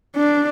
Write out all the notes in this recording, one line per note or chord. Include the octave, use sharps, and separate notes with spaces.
D4